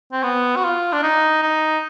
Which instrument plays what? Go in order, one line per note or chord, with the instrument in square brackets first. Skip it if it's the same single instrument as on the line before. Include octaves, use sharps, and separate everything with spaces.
[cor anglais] C4
B3
F#4
F4
D4
D#4
D#4